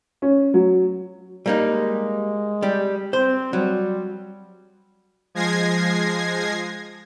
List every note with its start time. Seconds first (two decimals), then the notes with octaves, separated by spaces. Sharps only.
0.22 C#4
0.54 F#3
1.46 G3 A#3 D#4
1.67 G#3
2.62 G3 G4
3.13 C4 C5
3.53 F#3 G3
5.34 F3 G#3 G#6 A#6 C7